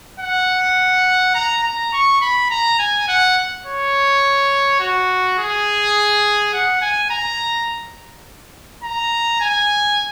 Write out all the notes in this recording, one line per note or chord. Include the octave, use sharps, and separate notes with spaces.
F#5
A#5
A#5
C#6
B5
A#5
G#5
F#5
C#5
F#4
G#4
F#5
G#5
A#5
A#5
G#5